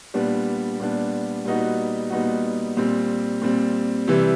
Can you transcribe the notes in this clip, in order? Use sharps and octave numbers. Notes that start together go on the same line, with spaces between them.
A#2 G3 B3 D4
A#2 G3 B3 D4
A#2 G3 B3 D#4 F#4
A#2 G3 B3 D#4 F#4
A#2 G3 C4
A#2 G3 C4
C3 E3 G3